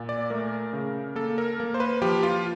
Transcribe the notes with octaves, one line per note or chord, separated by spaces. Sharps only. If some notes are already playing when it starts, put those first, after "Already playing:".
Already playing: A#2
D5
A3 A#4
C#3
A#3 A4
A#4
A#3
C5
B4
F3 G4
F4